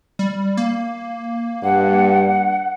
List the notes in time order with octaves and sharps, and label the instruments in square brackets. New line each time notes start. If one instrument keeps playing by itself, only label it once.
[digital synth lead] G3
A#3
[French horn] G2 [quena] F#5